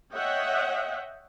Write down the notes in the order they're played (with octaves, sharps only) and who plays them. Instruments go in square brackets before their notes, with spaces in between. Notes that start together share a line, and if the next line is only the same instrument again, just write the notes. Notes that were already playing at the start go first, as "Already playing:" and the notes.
[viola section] C#5 D#5 E5 F#5 G5